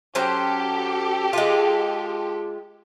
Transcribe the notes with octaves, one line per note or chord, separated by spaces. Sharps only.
F#3 C#4 G4 A4 C5
G#3 F4